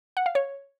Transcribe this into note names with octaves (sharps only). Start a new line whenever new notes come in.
F#5
F5
C#5